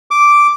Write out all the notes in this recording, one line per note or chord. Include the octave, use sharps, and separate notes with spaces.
D6